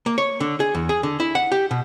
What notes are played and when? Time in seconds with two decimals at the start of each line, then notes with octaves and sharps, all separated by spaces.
0.06 A#3
0.18 C#5
0.40 D3
0.60 G#4
0.75 E2
0.89 G#4
1.03 D3
1.20 E4
1.35 F#5
1.52 G4
1.71 B2